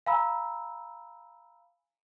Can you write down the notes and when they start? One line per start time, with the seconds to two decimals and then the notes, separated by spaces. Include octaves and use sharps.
0.06 F5 G#5 A#5 B5 E6